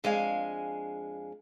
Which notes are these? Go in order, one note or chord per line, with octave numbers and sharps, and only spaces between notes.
F2 G#3 D4 F5 G#5